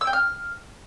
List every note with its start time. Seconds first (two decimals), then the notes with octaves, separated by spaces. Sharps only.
0.01 E6
0.07 G5
0.13 F6